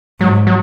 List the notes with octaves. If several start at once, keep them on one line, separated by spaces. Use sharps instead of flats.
G#2 F#3
F#3